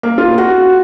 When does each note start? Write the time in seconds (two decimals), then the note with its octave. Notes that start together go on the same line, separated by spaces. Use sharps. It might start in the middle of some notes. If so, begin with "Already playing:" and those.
0.03 A#3
0.18 F4
0.38 F#4